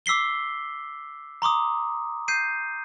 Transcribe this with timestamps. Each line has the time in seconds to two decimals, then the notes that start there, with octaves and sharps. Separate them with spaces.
0.06 D6 E6 B6 C7 G7
1.42 A#5 C6 D6 D#6
2.28 G6 C7 D#7